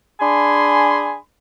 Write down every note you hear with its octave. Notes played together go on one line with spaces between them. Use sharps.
D4 G#4 G#5 B5 C6